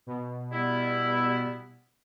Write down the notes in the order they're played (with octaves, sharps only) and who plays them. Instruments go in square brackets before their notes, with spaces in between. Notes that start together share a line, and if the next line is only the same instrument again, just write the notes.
[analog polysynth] B2
[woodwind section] G3 B3 E4